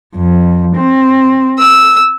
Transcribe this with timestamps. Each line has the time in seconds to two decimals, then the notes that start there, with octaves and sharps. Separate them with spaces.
0.14 F2
0.76 C4
1.59 E6